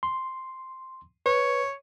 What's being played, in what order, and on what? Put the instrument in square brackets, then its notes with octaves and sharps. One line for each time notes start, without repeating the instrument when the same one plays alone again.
[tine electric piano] C6
[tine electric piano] B4 [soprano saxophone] C#5